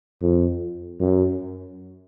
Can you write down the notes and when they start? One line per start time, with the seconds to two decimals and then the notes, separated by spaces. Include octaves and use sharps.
0.22 F2
0.99 F#2